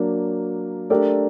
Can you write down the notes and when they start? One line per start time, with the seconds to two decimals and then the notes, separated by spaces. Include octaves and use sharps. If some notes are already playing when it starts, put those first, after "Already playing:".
Already playing: F#3 A#3 D4
0.90 A3 D4 G4 A#4 D5